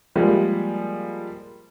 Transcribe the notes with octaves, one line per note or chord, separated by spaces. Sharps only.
F3 G3 G#3 A#3